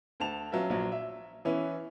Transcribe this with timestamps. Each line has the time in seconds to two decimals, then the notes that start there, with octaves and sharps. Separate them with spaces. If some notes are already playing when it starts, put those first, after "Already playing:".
0.20 D2 A5 F7
0.52 F#3 B3 C#4 F4 E5
0.70 A#1 F#3
0.92 E5
1.45 E3 B3 C#4 E4